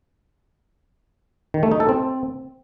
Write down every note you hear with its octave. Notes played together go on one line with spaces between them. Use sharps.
D#3
A3
D#4
A4
C4